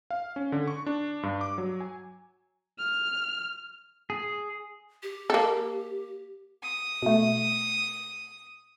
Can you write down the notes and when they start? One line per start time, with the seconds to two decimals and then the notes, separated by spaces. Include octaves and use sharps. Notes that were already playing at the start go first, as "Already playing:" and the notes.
0.11 F5
0.36 C#4
0.52 D3
0.67 C#6
0.86 D4
1.23 G2
1.41 D6
1.58 F#3
1.80 G#5
2.78 F6
4.10 G#4
5.03 G4
5.30 A#3 A4
6.63 D#6
7.02 B2 A3